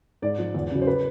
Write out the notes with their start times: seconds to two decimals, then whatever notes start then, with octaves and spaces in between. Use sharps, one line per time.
0.22 G#2 D5
0.39 F3
0.54 E2
0.71 C#3 F#3
0.82 C5
0.87 B4